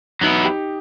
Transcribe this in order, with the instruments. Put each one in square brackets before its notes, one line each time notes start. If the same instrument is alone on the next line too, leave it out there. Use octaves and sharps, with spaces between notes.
[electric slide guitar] F#3 B3 E4 [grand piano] D#4
[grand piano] G4